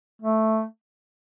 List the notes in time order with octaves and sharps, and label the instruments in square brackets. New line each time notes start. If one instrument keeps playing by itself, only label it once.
[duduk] A3